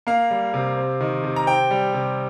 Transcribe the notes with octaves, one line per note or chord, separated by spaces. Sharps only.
A#3 F5
G3
C3
C4
D#3
C3
A#5
C4 G5
G3
C3